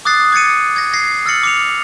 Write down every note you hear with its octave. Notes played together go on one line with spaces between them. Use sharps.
D6 D#6 F#6 A6 C7
D6 G#6 A6 C#7 D#7
G#6 A#6
G#6 A#6 C7
E6 F6 A6 A#6 C#7 F#7
D6 C#7 F7